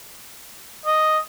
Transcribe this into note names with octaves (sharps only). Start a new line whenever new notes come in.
D#5